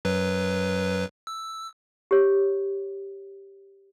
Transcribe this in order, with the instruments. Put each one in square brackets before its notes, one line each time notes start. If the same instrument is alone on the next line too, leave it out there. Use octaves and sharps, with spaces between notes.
[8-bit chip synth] F#2 F#3 B4
E6
[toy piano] G4 C#5